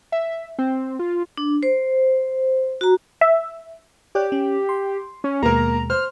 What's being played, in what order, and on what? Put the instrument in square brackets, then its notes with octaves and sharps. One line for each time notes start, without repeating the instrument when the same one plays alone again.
[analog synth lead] E5
C4
F4
[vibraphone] D4
C5
F#4 A#5
[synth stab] E5
[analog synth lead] G4 [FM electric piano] C#5 D5 F#6
[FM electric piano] C#4
C6
[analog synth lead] C#4
[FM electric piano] D#2 B2 G#3 [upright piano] A#3 A#4 [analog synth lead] A#5
[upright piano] C5 [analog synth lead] F6